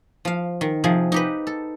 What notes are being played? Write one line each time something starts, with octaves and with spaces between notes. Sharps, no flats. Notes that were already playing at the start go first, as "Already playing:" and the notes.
F3 F5
D#3
C3 F3 G#4
D#4 G4 B4
A4